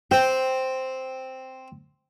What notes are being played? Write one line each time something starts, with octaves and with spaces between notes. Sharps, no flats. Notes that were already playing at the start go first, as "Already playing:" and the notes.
C4 G5